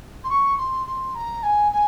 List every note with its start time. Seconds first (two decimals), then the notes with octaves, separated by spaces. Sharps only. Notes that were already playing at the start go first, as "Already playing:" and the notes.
0.24 C6
0.30 C#6
0.58 C6
0.87 C6
1.15 A#5
1.43 G#5
1.72 G#5